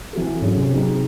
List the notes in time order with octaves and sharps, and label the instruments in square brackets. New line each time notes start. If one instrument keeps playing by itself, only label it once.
[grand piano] E3 C4 F#4 A4
[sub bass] G#2 [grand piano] F#3 C#4 G#4
[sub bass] C3
[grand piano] F#3 C4 D#4 G#4